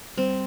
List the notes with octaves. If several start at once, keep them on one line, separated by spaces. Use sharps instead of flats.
G3 C4